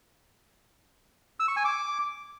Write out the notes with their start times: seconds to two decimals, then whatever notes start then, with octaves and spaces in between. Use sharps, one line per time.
1.40 E6
1.48 C#6
1.56 G#5
1.65 D6